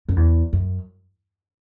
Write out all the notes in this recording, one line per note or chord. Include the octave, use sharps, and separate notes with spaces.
F#2
E2
F#2